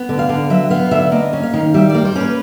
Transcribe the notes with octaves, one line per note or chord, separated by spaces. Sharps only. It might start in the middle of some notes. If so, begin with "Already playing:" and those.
Already playing: B3
D3
F5
D3
F#3 E5
B3 F5
D3 E5
A#3 D#5
C#4
F5
D#3
G3 E5
D5
A#3
C5
C#4
B4